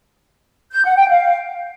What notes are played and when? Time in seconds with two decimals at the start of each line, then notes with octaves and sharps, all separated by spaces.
0.73 G6
0.85 F#5
0.97 G5
1.08 F5